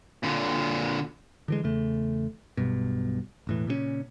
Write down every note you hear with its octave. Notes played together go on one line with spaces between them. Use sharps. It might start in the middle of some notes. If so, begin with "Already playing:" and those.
A#2 D3
D3 E3 G#3
E2 C#3 A3
B1 G2 B2
E1 A2 E3
A#2 C#3 F#3 C#4